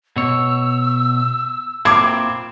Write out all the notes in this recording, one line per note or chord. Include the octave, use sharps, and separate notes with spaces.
B2 C#5 E6
A#2 C4 E4 D6 G#6